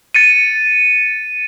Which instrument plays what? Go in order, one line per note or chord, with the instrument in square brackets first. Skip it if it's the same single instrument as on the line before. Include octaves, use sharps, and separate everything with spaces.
[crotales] A6 C#7 D#7